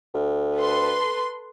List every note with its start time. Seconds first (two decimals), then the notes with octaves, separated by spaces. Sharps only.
0.14 D2
0.56 A4 B4 C6